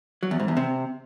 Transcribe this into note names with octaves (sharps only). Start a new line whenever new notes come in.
F#3
E2
G#2
E2
C3